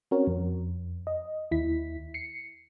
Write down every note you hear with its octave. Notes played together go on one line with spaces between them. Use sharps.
C4 C#4 F#4 A#4 C#5
F2
D#5
D#2 E4 B6
C7 C#7